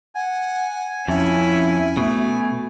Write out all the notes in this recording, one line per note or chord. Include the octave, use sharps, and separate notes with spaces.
F#5 G#5
F2 C#4 E4 E5
B2 A3